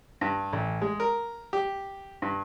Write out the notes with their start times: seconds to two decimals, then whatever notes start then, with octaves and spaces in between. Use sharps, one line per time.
0.21 G2
0.53 A1
0.81 G#3
1.00 A#4
1.53 G4
2.22 G2